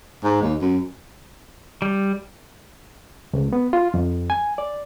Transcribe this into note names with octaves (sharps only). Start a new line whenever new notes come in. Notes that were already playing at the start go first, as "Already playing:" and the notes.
G#2
D#2
F#2
G3
C#2
B3
F4
F2
G#5
D5